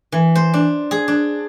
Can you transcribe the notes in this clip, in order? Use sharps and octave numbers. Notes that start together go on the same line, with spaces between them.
E3
C5
D4
G#4
D4